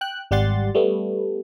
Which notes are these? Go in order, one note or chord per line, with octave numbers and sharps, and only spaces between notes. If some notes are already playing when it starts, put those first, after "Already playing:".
G5 F#6
G#1 G3 G4 F#5 C6 A6
G3 A3 B3